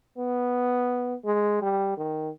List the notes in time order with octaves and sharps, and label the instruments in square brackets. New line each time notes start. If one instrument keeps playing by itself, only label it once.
[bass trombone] B3
G#3
G3
D#3